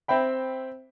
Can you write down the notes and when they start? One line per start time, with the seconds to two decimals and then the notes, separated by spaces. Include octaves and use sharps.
0.08 C4 E5 G5 B5